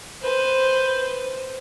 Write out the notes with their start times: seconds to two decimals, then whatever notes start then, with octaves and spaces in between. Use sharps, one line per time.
0.22 B4 C5